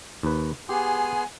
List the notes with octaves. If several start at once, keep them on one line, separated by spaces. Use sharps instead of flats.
D#2 B4
B3 G4 G#4 G#5 C6